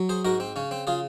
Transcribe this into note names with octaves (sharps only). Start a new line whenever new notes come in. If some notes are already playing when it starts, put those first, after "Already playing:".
Already playing: F#3
G#4 C5
G#2 F#4 A#4
C4
C#3 C#4
C4
C#3 F4 G#4